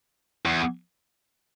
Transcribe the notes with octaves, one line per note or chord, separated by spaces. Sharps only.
E2